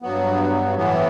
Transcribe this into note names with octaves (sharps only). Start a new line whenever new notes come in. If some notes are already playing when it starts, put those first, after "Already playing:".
G2 F#3 B3
A2 E3 B3